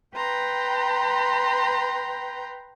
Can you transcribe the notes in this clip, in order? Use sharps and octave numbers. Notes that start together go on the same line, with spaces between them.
B4 G5 A#5 C6